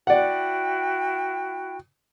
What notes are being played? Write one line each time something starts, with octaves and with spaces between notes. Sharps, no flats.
E4 F#4 D5 F#5 G5